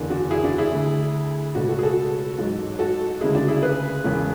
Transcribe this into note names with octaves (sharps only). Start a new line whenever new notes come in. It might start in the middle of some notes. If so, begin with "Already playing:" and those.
Already playing: F#1 E2 D3
D4 F#4
E4 G#4
D4 F#4
E4 G#4
D2 D3 A3
C#2 B2 A3 D4 F#4
F#4 A4
G#4
F#4 A4
A1 G#2 F#3 A3
F#4 A4
D2 C#3 G#3 E4 G#4
D4 F#4
E4 G#4
G#4 B4
E1 E2 C#3 E3